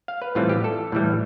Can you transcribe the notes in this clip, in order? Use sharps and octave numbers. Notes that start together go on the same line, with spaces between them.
F5
B4
A2 E3 G3 C4 F4
G4
A4
A2 E3 G3